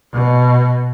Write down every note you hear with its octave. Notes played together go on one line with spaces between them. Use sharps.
B2